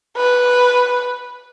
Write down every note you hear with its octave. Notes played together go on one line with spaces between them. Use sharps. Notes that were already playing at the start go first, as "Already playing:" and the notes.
B4